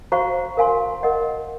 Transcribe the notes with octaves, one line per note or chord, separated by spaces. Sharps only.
F#4 C5 F5 A#5 C#6
A#4 F5 G#5 C6
A#4 D#5 F#5